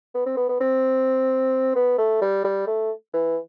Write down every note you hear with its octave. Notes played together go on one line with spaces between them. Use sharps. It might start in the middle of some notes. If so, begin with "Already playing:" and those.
B3
C4
B3
B3
C4
B3
A3
G3
G3
A3
E3